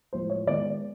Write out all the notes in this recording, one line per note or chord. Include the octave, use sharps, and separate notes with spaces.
A2 F3 G#3 C5
C#5
D#3 G#3 B3 D5